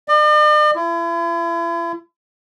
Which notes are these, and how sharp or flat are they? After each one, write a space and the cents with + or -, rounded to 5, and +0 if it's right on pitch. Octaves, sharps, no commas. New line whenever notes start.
D5 +45
E4 +40